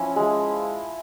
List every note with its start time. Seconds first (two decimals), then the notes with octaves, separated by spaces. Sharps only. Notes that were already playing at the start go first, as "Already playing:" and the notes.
Already playing: F3 C#4 E4
0.16 G#3